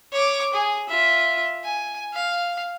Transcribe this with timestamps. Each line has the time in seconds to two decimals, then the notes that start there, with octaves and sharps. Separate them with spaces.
0.13 C#5 D6
0.54 G#4
0.89 F4 E5
1.64 G#5
2.14 F5